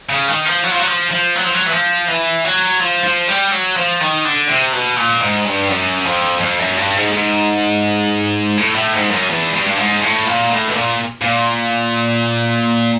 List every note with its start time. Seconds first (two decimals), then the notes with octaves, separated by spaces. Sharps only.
0.09 C#3
0.28 D#3
0.46 F3
0.64 F#3
0.72 F3
0.79 F#3
0.88 F3
1.12 F3
1.36 F#3
1.45 F3
1.54 F#3
1.67 E3
1.72 F3
2.08 E3
2.44 F#3
2.80 F3
3.04 F3
3.29 G3
3.52 F#3
3.76 F3
4.00 D#3
4.25 D3
4.48 C3
4.73 B2
4.97 A#2
5.20 G#2
5.45 G2
5.69 F#2
6.05 F2
6.41 F2
6.59 F#2
6.77 G2
6.95 G#2
7.13 G#2
8.57 A2
8.75 A2
8.93 G#2
9.11 F#2
9.29 E2
9.53 G2
9.67 G2
9.78 G#2
10.02 A2
10.26 A#2
10.50 A2
10.68 B2
10.74 A#2
11.22 A#2